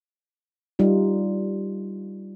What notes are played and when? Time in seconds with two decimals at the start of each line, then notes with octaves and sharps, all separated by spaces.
0.79 G3 D#4 F4